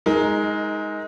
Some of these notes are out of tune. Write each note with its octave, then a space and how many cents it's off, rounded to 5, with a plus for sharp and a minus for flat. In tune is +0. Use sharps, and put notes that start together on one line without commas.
G#3 +0 D#4 +25 A#4 +0